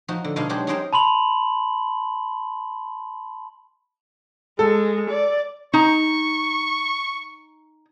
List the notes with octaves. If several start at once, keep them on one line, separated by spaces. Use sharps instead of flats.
F3 D#4 F#4
D3
B2 G#3 D4 D#4 G#4 F5
F#3 G#3 D4 G4 G#4 C5
C#4 D#4 G#4 A#4 C5 G5
A5 B5 C6 F#7
G#3 A4
D5
D#4 A#5 C#6